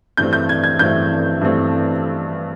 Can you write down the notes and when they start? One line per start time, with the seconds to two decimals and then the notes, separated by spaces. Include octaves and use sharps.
0.17 G2 E3 A3 C4 G6
0.33 G6
0.49 G#6
0.64 G#6
0.79 G2 E3 A3 C4 G6
1.41 G2 E3 A3 C4